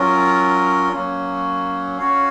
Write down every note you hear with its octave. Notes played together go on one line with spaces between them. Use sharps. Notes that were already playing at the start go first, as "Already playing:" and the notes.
Already playing: F#3 C#4 F4 A#4
F#3 A#3 C#4
C#4 F#4 C#5 F5